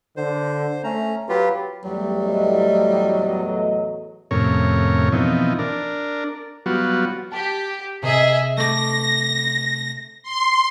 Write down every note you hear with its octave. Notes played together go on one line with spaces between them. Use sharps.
D3 C5
A3 C#4 A#5
F#3 F4 G4 B4
E2 F#3 G3 A3
A2 F#4 D#5
F2 A2 C3 C#4 A#4 C#5
B2 E3 F3 C4 D#4
D4 A#4
F#3 G3 B3 F4 F#4
G4 A5
C3 G#4 D#5 E5
A3 D6 A#6
C6